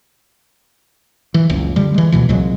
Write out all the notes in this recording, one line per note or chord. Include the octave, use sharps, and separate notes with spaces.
E3
F#1 C#2
D3 G3
E3 G#3
D2 B2 E3
C2 A#2 F#3 G#3